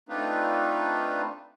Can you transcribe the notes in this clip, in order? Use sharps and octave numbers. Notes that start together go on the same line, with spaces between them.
A3 C4 D4 D#4 F4 B4